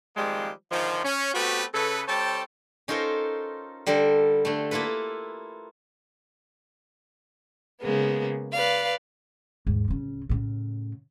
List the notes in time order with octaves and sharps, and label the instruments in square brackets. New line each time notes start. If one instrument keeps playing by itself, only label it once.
[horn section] D#3 F3 G3 G#3 A#3 C4
G#2 D3 D#3 F3
C#4
A3 B3 C4 F#4 G4 B4
C#3 A4 B4
G3 C4 A4 C#5 G5 A5
[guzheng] C#4 D#4 F4 A4 A#4 C5
D3 G3 A4 A#4 C5
D3 A3
A#3 E4 F4 A4 B4
[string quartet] C#3 G#3 A#3 B3
B4 D5 F5
[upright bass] D#2 G#2
D1 C#3
A2 C#3